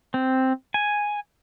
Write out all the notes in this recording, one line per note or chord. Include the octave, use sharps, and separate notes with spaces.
C4
G#5